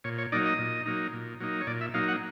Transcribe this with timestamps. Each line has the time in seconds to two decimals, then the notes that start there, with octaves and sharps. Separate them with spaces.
0.04 A#2 C#5
0.18 C#5
0.32 F#3 A#3 D#4 D5
0.46 D#5
0.59 A#2
0.86 F#3 A#3 D#4
1.13 A#2
1.40 F#3 A#3 D#4
1.61 C#5
1.67 A#2 D5
1.81 E5
1.94 F#3 A#3 D#4 F5
2.08 F#5